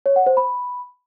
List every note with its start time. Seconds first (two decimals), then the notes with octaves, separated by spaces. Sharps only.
0.06 C#5
0.16 F#5
0.26 C5
0.37 B5